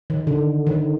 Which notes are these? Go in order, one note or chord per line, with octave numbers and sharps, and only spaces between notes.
D#3
D3
D#3